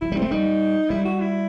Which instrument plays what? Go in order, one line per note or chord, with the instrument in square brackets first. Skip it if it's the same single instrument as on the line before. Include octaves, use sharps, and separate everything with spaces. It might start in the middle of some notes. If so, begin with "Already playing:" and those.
[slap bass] F#3 [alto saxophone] E4
[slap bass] G3
[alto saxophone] C4
[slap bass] A3
[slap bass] G3 [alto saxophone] D#4
[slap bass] G3 [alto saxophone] E4
[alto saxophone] F#4
E4